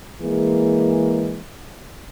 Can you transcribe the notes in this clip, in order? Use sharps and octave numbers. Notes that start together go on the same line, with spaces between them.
E3 G#3 A#3 G#4